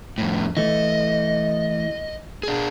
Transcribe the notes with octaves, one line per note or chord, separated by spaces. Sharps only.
F2 A2
E3 A3 D#5
D4 G#4